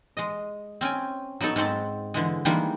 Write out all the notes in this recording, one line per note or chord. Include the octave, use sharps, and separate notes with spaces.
G#3 D#5
C4 C#4 G5 G#5
F#3 B3 D#4 A4 C#5
G#2 G#3 C4 F#5 A5
D3 E3 G#3
D#3 E3 G3 G#3 A#3 D4